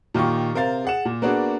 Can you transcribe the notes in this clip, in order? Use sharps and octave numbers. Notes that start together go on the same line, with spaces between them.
A#2 D#3 F4 G4 C#6
C3 A#4 C5 F5 A6
G#4 F#5 E7
A#2
A#3 B3 D4 F#4 G#4